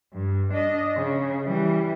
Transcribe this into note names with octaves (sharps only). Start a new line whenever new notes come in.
G2
D4 D#5
C#3
E3 G3